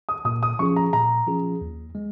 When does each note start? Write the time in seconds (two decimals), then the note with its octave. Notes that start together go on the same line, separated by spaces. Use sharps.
0.09 D#6
0.25 A#2 D#6
0.43 D#6
0.59 F3 C#4 F4 G#4 C#6
0.76 A#5
0.93 A#2 A#5
1.27 F3 C#4 F4 G#4
1.61 D#2
1.95 G#3